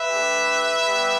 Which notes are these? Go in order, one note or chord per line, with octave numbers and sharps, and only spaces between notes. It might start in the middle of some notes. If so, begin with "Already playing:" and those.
Already playing: B4 E5
A3 D4 G4
G3 B3 G4